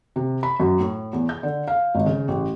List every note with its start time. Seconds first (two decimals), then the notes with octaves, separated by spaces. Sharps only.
0.16 C3
0.43 B5
0.60 F#2
0.79 A2
1.13 E2
1.29 G6
1.43 D3
1.68 F5
1.95 G#1
2.06 C#3
2.28 A1